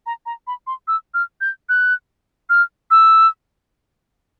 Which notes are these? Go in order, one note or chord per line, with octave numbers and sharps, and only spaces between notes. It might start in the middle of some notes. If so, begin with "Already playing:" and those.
A#5
A#5
B5
C6
E6
F6
G6
F#6
F6
E6